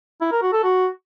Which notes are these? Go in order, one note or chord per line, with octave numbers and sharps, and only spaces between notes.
E4
A#4
F#4
A4
F#4